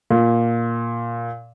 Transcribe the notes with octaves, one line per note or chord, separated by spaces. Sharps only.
A#2